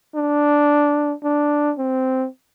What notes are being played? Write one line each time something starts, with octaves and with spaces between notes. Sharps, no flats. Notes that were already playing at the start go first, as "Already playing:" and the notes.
D4
D4
C4